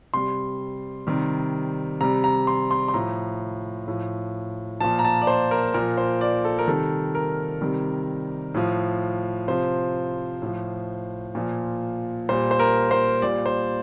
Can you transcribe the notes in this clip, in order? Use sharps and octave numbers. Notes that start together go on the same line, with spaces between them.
C3 G3 C6
C3 D#3 G3
C3 G3 A#5
A#5
C6
C6
C6
A2 F3 A#5
A2 F3
A#2 F3 A5
A#5
A5
D5
C5
A#4
A#2 F3 A#4
C5
D5
A4
A#4
C3 D#3 G3 A4
A#4
C3 D#3 G3
A2 F3
C3 F3 C5
A2 F3
A#2 F3
A#2 G3 C5
C5
A#4
C5
A#2 G3 D5
C5